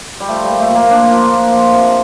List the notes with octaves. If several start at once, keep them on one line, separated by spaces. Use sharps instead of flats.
G3
F3 A3
G3
A#2
A3
A#2 A#3
F3 D4
F3
A#2
F3
C3